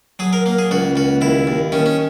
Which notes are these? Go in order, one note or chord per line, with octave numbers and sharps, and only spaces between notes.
F#3 G#4
A#4
A#3
G#4
C#2 F#4
C#2 F#4
D#2 E4
D#2
D#3 C#4
C#4